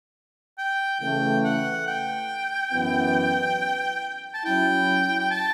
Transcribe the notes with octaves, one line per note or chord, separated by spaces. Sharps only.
G5
C#3 E3 A3 G5
F#5
G5
F#2 E3 B3
A5
F#3 C#4 E4 G5
G5
A5